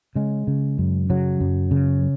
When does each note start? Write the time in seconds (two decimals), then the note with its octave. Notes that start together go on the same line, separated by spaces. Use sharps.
0.16 C#3 G#3
0.47 C#3
0.78 F#2
1.10 C#3 F#3
1.40 F#2
1.71 C#3